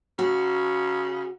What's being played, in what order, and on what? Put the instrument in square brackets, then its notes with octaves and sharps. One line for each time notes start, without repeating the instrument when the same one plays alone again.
[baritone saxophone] C#3 [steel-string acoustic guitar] F#4